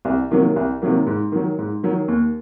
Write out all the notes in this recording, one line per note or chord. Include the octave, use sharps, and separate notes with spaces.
C2
C3 D#3 F#3 A#3
C2
C3 D#3 F#3 A#3
G#2
D#3 F#3
G#2
D#3 F#3
D#2